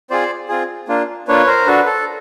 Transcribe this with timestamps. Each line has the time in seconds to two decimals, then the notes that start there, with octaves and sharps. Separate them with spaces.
0.10 C4 F4 G#4 C5 D5
0.49 C4 F4 G#4
0.88 A#3 D4 F4
1.28 A#3 D4 F4 B4 C#5
1.47 A#4 C5
1.66 D4 F#4 A4 B4
1.86 A4